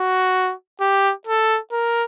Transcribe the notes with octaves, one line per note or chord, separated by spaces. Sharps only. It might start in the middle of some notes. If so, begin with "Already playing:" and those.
Already playing: F#4
G4
A4
A#4